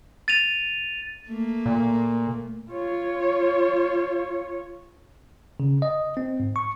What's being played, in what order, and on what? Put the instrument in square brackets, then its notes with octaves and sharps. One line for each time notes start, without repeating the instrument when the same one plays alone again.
[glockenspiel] A6 D#7 F7
[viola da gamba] A3 A#3
[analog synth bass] A#2
[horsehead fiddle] F4 C#5
[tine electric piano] C#3
D#5
C4
G#2
C#6